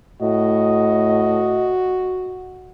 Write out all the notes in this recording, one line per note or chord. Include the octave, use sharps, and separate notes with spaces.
A2 F#4 D#5